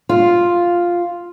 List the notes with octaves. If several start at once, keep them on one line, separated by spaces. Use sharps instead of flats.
F4